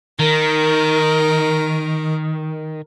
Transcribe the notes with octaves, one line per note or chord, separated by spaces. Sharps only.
D#3 A#4